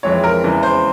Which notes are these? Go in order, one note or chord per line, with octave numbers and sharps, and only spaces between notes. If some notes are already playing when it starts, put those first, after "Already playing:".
F2 E3 G#3 C4 C#5
A#4
E2 C#3 E3 G#3
C5